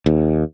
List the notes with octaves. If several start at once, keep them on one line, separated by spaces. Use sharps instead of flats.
D#2